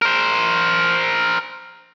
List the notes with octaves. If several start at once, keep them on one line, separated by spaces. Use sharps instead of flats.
A#4 C5